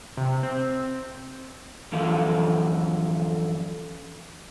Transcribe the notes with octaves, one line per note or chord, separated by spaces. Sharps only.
C3
C4
F#2 D3 E3 F3 A4 F5